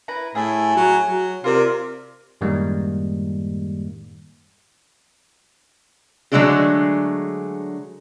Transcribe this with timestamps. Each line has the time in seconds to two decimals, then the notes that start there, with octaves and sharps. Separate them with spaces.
0.08 E4 B4 A#5
0.35 A2 E4 G#4
0.76 F#3
1.07 F#3
1.44 C3 F4 A#4 D5
2.41 F#2 A2 D#3 G3 G#3 A#3
6.32 D3 F#3 G#3 A3 D4 G#4